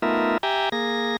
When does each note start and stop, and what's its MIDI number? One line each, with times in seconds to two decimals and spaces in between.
0.02 0.38 57
0.02 0.38 59
0.02 0.38 63
0.02 0.38 65
0.02 0.38 70
0.02 0.38 76
0.43 0.69 67
0.43 0.69 76
0.43 0.69 79
0.43 0.69 80
0.43 0.69 82
0.72 1.17 58
0.72 1.17 68
0.72 1.17 94